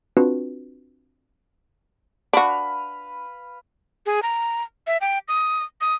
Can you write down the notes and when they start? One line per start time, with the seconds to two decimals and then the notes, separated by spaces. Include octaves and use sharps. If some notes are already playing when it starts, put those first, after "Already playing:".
0.17 C4 D4 F4 F#4 B4
2.33 D4 F#4 B4 F5 B5
4.06 G#4
4.23 A#5
4.87 E5
5.01 G5
5.28 D#6
5.81 D#6